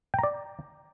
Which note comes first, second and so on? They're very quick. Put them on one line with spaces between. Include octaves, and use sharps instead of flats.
G5 A#5 D5